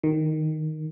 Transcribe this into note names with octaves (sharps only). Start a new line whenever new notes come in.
D#3